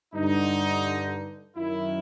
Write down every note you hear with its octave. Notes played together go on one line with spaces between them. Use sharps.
G2 D3 D#4
F#2 D#3 E4